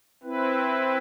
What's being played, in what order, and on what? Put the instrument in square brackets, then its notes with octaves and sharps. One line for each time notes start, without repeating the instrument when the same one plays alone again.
[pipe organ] C4 E4 B4